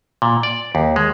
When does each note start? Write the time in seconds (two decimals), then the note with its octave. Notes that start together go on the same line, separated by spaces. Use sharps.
0.22 A#2
0.43 D5
0.75 D#2
0.96 G#3